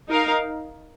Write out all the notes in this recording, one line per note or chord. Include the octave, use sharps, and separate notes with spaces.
D#4 A#4 F5